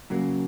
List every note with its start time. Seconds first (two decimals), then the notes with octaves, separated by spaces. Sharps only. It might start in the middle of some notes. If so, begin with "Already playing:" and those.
0.10 F#2 C#3 F#3 A#3